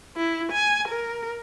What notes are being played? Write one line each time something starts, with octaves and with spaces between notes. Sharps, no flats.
E4
G#5
A#4